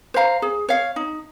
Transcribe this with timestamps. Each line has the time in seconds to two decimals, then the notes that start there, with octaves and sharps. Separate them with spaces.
0.14 C5 F5 A#5
0.42 G#4
0.69 C#5 F5
0.96 D#4